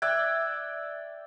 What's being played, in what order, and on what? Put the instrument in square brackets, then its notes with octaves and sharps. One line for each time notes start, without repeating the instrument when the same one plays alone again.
[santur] D5 E5 G5 [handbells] F#6 G#6